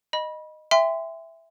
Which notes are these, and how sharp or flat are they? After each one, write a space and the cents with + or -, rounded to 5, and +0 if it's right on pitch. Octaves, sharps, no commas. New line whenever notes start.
D#5 -10 B5 -25
E5 +0 G5 +40 C6 -25